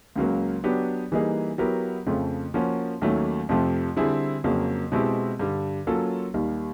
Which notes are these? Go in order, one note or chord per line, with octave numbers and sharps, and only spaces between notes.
C#2 C#3 F#3 A#3
F#3 B3 D4 G4
E3 G3 A#3 D#4 G#4
F#3 B3 E4 G4 A#4
F2 C#3 F3 A3
F3 A#3 C#4 F#4
D#2 D#3 F#3 A3 C#4
F2 C3 F3 A3
D3 G3 C4 E4 G#4
F2 C#3 F#3 A#3
B2 G#3 C4 E4 G4
G2 D3 G3
F#3 A#3 C#4 F4 A4
D#2 D#3 G3